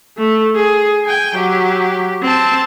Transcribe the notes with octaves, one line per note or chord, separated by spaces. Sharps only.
A3
G#4
G5 G#5
F#3 G4
C4 A5